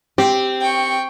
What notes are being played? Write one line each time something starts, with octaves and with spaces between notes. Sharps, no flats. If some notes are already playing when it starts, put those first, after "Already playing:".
C4 G4
G5 C#6